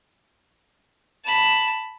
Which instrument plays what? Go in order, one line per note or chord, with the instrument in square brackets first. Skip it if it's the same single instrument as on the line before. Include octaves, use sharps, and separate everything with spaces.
[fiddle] A5 B5